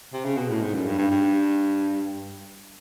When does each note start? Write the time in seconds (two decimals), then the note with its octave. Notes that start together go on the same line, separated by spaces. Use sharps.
0.13 C3
0.24 C#3
0.37 B2
0.49 A2
0.62 G#2
0.74 F#2
0.86 G2
0.99 G2
1.11 G2